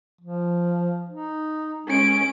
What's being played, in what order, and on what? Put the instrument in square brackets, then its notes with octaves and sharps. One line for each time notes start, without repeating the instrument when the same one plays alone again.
[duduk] F3
D#4
[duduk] G#3 [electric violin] C#4 D7